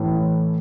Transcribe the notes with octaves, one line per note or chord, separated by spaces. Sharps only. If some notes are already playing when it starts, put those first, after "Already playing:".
Already playing: A2 E3